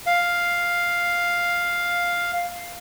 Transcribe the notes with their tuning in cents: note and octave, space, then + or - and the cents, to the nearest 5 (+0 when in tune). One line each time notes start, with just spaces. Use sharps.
F5 +5